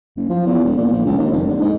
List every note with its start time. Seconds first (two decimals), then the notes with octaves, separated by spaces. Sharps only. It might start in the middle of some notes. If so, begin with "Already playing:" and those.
0.16 F#1
0.29 F3
0.46 E2
0.64 E1
0.77 A#2
0.92 A#1
1.06 C#2
1.18 D#2
1.31 F1
1.48 D3
1.61 G#2